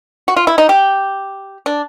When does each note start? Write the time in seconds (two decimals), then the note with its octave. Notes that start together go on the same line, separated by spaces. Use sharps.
0.28 F#4
0.36 F4
0.47 E4
0.58 D#4
0.69 G4
1.66 D4